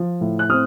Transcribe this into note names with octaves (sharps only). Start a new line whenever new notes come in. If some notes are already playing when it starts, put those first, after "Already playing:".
Already playing: F3
A2
F#6
C4 D#6 F6